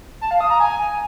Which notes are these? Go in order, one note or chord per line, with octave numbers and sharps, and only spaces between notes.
A5
F5
D#6
A#5
G#5